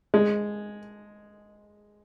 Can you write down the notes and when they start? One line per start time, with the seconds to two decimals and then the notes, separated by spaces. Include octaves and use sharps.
0.14 G#3